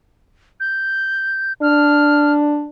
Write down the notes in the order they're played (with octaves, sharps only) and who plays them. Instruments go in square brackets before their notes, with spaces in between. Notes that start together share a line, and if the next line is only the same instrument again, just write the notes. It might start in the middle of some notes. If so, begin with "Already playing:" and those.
[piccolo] G6
[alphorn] D4 [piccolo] F6